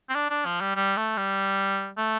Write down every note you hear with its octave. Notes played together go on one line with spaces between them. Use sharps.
C4
D4
D4
F3
G3
G3
A3
G3
A3